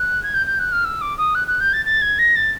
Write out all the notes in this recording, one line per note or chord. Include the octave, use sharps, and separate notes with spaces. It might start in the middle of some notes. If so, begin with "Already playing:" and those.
Already playing: F#6
G#6
G6
G6
F#6
F6
E6
D6
D#6
F#6
F#6
G6
A6
A6
G#6
A#6
A6